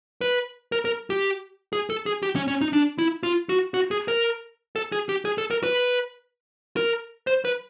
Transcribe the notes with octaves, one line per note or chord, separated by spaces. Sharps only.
B4
A#4
A#4
G4
G#4
A4
G#4
G4
C#4
C#4
D#4
D4
E4
F4
F#4
F#4
G#4
A#4
A4
G#4
G4
G#4
A4
A#4
B4
A#4
C5
B4